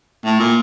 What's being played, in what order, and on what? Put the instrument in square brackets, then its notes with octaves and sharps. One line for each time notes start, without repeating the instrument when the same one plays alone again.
[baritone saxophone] A2
A#2